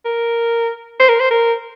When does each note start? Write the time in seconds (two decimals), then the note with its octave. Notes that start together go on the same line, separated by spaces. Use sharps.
0.05 A#4
0.99 C5
1.09 A#4
1.20 C5
1.31 A#4